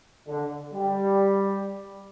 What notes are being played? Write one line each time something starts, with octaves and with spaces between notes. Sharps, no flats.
D3
G3